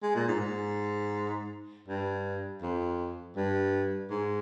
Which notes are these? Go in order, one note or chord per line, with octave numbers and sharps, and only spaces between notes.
G#3
A#2
G#2
G#2
G2
F2
G2
G#2